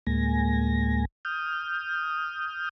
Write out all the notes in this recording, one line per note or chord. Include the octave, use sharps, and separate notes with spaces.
D2 A2 G#3 A#3 G#5 A#6
D#6 F6 G6